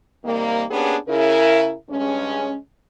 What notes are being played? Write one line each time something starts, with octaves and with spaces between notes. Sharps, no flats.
C3 D#3 G3 A#3
A#3 B3 C#4 D4 G4 G#4
C#3 E4 A#4
G2 C#3 G#3 C#4